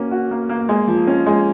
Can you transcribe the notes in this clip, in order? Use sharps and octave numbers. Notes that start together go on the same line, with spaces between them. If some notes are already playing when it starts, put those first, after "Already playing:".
Already playing: A#3 C#4 F#4
F#4
A#3
A#3
G#3
F3
C#4
G#3